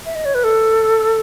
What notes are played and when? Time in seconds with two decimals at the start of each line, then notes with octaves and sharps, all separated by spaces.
0.06 E5
0.15 D#5
0.25 C#5
0.35 B4
0.44 A4